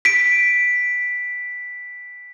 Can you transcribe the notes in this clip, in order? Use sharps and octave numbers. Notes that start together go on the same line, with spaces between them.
B6 D7